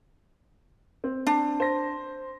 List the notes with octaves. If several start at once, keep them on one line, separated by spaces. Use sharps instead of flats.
C4
D4
C5 A#6